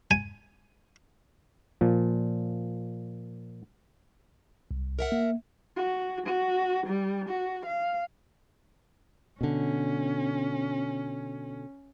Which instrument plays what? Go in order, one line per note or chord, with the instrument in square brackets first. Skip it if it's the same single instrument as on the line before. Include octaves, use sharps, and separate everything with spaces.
[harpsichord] G#5
[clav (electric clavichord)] A#2 F3
[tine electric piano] C2
[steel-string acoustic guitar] A#4 E5 F#5
[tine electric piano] A#3
[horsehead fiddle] F#4
F#4
G3
F#4
F5
[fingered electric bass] B2 D3 [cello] C#4